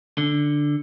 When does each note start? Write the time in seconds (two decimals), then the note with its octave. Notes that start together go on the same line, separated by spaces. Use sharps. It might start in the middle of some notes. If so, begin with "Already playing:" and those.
0.18 D3